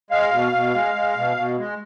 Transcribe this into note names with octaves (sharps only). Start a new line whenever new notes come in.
G#3 F5
B2
B2
G#3
G#3
B2
B2
G#3